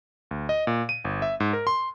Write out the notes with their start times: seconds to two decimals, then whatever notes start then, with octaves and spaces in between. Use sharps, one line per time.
0.31 D2
0.49 D#5
0.67 A#2
0.89 D#7
1.05 G1
1.22 E5
1.40 G#2
1.53 A#4
1.67 C6